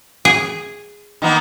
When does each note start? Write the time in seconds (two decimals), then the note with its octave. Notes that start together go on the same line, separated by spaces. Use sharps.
0.25 G#4
1.22 D#3 A#3 B3